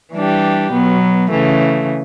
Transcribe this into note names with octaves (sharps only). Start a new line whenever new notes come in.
E3 G3 D4 G4
B2 F#3 B3
C#3 E3 A3